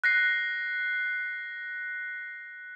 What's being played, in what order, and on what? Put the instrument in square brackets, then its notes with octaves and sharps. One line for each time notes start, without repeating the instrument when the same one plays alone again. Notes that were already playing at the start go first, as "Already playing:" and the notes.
[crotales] F#6 A#6 C7